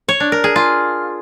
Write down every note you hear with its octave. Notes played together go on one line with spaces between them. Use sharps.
C#5
D4
A#4
G#4
F4